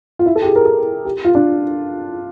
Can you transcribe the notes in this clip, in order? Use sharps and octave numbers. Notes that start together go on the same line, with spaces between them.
F4
E4
A4
G4
G#4
A#4
A4
G4
F4
D4